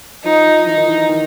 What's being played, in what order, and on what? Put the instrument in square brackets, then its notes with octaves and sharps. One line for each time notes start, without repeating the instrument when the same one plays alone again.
[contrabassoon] F3 [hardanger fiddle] D#4
[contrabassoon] E3 [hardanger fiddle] D#4
[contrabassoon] D#3
E3
D#3